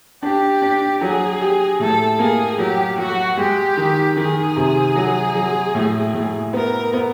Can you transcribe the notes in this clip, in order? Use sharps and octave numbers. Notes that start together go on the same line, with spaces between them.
D4 G4
D4
F#3 G#4
G4
A2 A4
A#3 G#4
F#3 G4
F#3 F#4
G#3 G4
D#3
D#3 G#4
C3
F#3
F#3
A2
A2
B3 A#4
B3